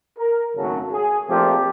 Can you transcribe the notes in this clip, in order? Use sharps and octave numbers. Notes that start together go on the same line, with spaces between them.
A#4
G#1 F#2 C#3 F#3 A3 A4
G#4
A#1 A#2 F3 A3 C4 G4